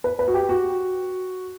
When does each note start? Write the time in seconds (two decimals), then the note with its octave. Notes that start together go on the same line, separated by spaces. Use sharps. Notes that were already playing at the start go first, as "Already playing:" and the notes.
0.04 B4
0.19 B4
0.28 F#4
0.34 G4
0.49 F#4